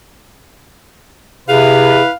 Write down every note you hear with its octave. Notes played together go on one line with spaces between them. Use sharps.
C3 E4 G#4 B4 F5